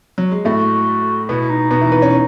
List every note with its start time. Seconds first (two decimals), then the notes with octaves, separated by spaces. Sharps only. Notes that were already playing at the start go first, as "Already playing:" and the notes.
0.18 F#3
0.32 G#3
0.45 A2 A3 F#4
1.29 B2 B3 E4
1.50 D#4
1.71 B2 B3
1.81 E3 E4
1.92 B3 B4
2.02 C#4 C#5